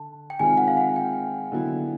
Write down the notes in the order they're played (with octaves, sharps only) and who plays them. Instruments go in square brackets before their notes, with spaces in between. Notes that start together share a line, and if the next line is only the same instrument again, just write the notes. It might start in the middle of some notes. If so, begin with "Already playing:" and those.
Already playing: [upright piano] D3 [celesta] A5
[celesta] G5
[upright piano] D#3 G#3 C4 F4 [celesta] G#5
[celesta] F#5
F5
F#5
G5
[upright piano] D3 F#3 B3 E4